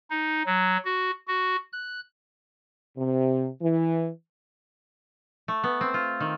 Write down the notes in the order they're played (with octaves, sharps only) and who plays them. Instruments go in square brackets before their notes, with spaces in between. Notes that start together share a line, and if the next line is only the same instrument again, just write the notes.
[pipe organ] D#4
F#3
F#4
F#4
F#6
[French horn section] C3
E3
[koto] A3
B3
C4
F4
D#3